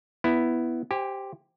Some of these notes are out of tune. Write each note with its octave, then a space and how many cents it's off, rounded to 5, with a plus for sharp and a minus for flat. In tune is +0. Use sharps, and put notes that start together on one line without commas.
B3 +0 E4 +0
G4 +0 C5 +0 G#5 -30